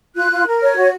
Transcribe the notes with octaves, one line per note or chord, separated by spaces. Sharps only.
F4 F#6
F4
A#4
C#5
F#4